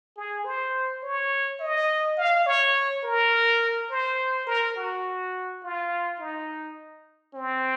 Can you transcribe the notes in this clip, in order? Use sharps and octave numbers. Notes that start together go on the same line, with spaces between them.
G#4
C5
C#5
D#5
F5
C#5
A#4
C5
A#4
F#4
F4
D#4
C4